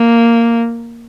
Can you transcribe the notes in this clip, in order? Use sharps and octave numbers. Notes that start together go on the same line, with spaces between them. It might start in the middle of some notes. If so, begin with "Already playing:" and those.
Already playing: A#3